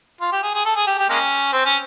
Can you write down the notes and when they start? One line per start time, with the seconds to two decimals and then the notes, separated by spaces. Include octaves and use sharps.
0.21 F4
0.33 G4
0.43 G#4
0.55 G#4
0.66 A4
0.76 G#4
0.87 G4
0.99 G4
1.09 G#3 A#3 C#4
1.53 C4
1.66 C#4